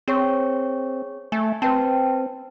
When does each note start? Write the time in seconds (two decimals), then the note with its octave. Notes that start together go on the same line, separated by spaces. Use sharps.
0.08 C4 G#4 C#5 C#6
1.32 A3 G#5
1.62 C4 B4 G5 A5